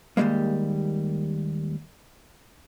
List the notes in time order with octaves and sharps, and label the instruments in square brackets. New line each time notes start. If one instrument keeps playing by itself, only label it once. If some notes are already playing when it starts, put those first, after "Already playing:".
[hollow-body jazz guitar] D#2 B2 G3 G#3 A#3